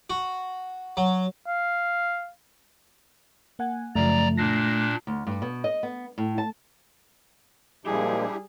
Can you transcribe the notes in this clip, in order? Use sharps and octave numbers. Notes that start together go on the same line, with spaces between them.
F#4
F#3
F5
A#3 F#5 G#5
F#2 C#3 F3 A3 D5 A#5
A#2 D4 A#6 C7
D2
G2
B2
D#5
B3
A2
A5
A#2 F3 G3 G#3 D4 E4 G4 G#4